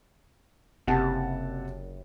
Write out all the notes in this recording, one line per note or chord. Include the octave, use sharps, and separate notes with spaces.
F#1 C3 F#5 A5